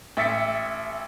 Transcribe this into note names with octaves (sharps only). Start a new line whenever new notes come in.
A1 E5 A6 B6 C#7